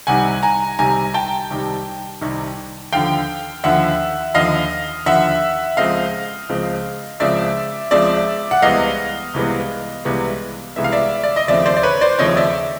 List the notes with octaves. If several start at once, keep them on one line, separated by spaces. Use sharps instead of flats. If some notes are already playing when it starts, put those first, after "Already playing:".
C2 C3 D#3 G3 F#5 G#5
G#5 A#5
C2 C3 D#3 G3 G#5 A#5
G5 A5
C2 C3 D#3 G3
C2 C3 D#3 G3
D#2 D3 F3 F5 G5
D#2 D3 F3 E5 F#5
D#2 D3 F3 D#5 F5
D#2 D3 F3 E5 F#5
C#2 C#3 F3 G#3 C4 D#5 F5
C#2 C#3 F3 G#3 C4
C#2 C#3 F3 G#3 C4 D5 E5
C#2 C#3 F3 G#3 C4 D5 E5
F#5
C2 C3 E3 G#3 B3 D#5 F5
C2 C3 E3 G#3 B3
C2 C3 E3 G#3 B3
C2 C3 E3 G#3 B3 E5
F5
D5 E5
D5
D#5
D#2 C#3 F3 A3 C4 D5 E5
C5 D5
D5
B4 C#5
C5 D5
D#2 C#3 F3 A3 C4 C#5 D#5
D5 E5